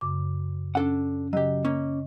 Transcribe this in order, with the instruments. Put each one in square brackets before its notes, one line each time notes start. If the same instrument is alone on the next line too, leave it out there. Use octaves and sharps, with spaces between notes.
[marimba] F#2 C#3 D6
[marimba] C#4 [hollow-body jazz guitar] D4 A4 F#5
[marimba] C#3 D#5 [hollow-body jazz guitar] F#3 G4
[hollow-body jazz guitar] A#3 C#4